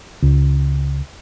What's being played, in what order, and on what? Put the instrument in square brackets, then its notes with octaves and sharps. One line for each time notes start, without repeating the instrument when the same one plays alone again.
[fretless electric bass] C#2